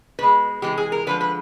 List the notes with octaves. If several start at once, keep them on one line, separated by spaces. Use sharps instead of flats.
B2 G#3 B4
C3 E3 G#3 G4
G#4
A#4
D3 F3 G#3 B4
B4